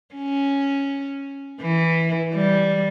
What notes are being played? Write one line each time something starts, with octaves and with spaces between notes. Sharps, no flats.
C#4
E3
G3